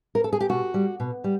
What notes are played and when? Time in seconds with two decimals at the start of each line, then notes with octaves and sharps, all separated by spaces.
0.15 A#4
0.24 A4
0.33 G#4
0.40 G4
0.49 B2 F#4
0.74 G3
1.00 B2
1.24 G3